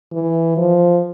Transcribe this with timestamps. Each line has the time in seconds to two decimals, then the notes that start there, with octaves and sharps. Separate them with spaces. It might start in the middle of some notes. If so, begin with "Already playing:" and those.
0.12 E3
0.57 F3